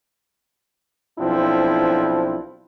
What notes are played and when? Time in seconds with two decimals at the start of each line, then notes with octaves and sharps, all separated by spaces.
1.19 B1 F3 C4 D4 E4